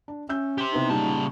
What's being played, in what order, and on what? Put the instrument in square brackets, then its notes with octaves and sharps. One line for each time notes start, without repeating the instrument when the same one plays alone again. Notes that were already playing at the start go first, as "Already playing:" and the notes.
[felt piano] D4
[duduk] C#4 [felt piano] E5 E6 G6
[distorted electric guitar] G4 C5
[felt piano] C3 B3 E4 [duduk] D#4
[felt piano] A#2 G3 [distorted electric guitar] C#3 A5